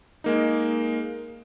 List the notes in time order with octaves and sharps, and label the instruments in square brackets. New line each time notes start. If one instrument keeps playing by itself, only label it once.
[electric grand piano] G#3 A#3 D#4